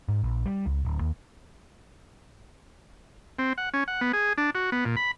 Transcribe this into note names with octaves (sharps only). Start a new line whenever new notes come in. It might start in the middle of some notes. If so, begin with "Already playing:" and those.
G#2
A#1
G3
C#2
D1
D#2
C4
F#5
C#4
F#5
B3
G#4
D4
F#4
B3
A#2
B5